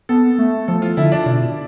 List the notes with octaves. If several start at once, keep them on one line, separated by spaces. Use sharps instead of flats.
B3 A4
A3
F3 A4
F4
D3 E4
D4
B2 D4